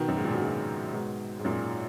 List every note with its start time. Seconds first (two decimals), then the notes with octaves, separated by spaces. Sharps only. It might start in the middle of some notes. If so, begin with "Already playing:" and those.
Already playing: B2 D#3
0.08 F#2
0.17 G#2
0.24 A#2
0.33 B2
0.42 A#2 C#3
0.93 G#2 B2
1.39 G#2
1.44 F#2 A#2